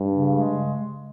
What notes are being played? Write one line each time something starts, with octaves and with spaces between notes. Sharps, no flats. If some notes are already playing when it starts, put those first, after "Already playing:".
Already playing: G2
C#3
G#3
C#3